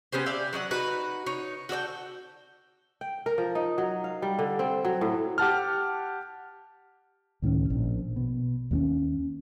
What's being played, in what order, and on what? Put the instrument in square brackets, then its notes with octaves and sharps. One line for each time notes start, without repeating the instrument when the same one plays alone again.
[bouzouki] B3 C#4 G4 C5
G4 D5 E5 F5
F#3 D#4 D5 F#5
D#4 F#4 B4
D#4 C#5
F#4 A4 D5 G5
[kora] G5
A#4
F3
D#4
F#3
F5
G3
D3
C4
F#3
A2
[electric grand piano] G4 F#5 A5 F6
[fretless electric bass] C#2 A2 D#3 C#4
A#1
B2
D#2 A#3 C#4